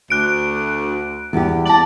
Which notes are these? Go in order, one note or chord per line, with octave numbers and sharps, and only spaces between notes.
D2 F#6 D7
E2 G4
D5 A5 F#7